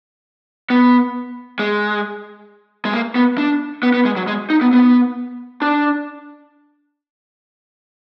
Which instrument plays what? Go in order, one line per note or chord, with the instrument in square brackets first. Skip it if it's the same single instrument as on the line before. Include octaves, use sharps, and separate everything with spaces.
[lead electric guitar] B3
G#3
G#3
A#3
B3
D4
B3
B3
G#3
F#3
G#3
D#4
B3
B3
D4